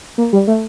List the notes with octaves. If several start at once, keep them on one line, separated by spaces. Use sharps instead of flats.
A#3
G3
A3